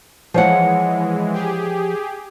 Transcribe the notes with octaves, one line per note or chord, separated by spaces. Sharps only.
E3 F3 G#3 C#5 F#5
G4 G#4